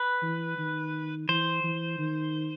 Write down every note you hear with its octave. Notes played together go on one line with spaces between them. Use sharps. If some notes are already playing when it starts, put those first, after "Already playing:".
Already playing: B4
E3
D#3
E3 C5
E3
D#3